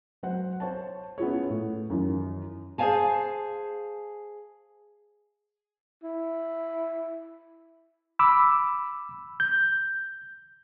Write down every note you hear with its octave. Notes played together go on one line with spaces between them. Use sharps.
F#3 C5 F#5
C5 C#5 A5
B3 C#4 E4 F4 G#4 C#5
A2
F#2 D#3 E3
G#4 C5 C#5 F5 G#5 A5
E4
B5 D6 E6
G6